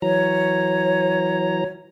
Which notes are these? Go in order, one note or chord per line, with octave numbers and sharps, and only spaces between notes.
E3 F#3 C#5 A#5